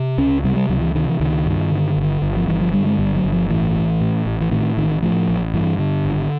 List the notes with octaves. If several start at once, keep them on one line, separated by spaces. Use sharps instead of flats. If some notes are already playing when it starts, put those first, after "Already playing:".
Already playing: C3
C#2 C#4
C3 G3
G3
C#2 F#3
E3
C3 D#3
E3
C#2 D#3
G2
D3
G1
G1
F3
G2 E3
F3
D3 G3
G#3
G1 G3
F#3
G1
F3
A2 E3
A1
A2
A1
E3
A2 D#3
A1 D#3
A2 F3
A1
G2 E3
D3
G#1